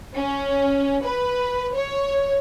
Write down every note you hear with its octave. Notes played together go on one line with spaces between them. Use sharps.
C#4
B4
C#5